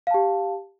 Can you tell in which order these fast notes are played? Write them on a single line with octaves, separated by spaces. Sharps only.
F5 A5 G4